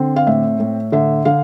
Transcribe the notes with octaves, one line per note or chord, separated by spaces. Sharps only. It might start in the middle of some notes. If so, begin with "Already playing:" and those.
Already playing: D3 C4
F5
A2 E5
A2
D3 E5
D3 F5